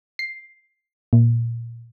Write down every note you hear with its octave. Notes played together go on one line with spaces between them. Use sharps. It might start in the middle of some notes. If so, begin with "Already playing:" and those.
C7
A#2